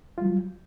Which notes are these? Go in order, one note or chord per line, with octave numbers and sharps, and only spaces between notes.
F#3 G3 F4